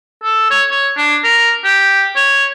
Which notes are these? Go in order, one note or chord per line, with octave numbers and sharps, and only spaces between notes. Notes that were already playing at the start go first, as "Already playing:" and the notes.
A4
C#5
C#5
D4
A#4
G4
C#5